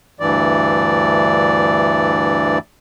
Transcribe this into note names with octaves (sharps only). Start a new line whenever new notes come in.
D2 G2 E3 D5